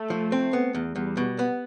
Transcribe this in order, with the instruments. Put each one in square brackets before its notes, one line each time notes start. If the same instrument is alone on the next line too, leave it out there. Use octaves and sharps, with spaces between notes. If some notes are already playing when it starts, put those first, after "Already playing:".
Already playing: [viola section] A3
[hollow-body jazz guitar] F3
C4
B3
E2
[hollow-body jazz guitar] E2 [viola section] G3
[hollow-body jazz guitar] B2
B3